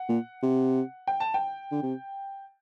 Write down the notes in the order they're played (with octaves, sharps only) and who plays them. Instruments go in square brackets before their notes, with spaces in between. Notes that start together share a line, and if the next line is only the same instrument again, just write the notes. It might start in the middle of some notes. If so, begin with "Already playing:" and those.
Already playing: [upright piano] F#5
[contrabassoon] A#2
C3
[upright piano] G5
A5
G5
[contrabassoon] D3
C3